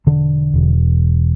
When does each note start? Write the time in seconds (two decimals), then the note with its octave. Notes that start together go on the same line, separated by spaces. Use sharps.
0.06 E1 D3
0.54 E1